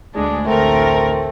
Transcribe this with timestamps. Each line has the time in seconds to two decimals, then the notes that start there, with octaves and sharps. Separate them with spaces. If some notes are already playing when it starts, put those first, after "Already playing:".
0.16 D2 G#3 D4
0.46 A1 D2 A3 C4 A#4